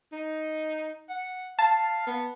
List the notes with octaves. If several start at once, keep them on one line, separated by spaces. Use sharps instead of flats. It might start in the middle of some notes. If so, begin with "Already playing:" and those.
D#4
F#5
F5 A5
B3